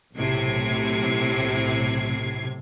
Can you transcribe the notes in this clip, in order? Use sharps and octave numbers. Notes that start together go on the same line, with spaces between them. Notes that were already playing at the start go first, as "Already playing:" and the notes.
B1 A2 C3 G#6 C7